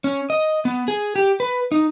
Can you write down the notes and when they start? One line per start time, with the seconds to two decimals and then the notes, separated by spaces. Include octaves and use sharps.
0.04 C#4
0.30 D#5
0.65 B3
0.88 G#4
1.16 G4
1.40 B4
1.72 D#4